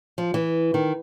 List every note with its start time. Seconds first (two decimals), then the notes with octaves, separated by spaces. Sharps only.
0.18 F3
0.34 E3
0.74 D#3